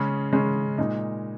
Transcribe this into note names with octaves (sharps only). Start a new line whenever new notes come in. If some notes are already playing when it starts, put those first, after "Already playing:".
Already playing: C#3 G#3 C#4
C#3 G#3 C#4
A#2 G#3 D#4